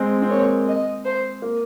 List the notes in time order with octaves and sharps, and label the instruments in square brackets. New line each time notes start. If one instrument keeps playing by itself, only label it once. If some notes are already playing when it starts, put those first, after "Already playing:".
Already playing: [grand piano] G#3 C4
C4
[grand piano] A#3 [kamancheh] C#5
[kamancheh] D#5
C5
[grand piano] A#3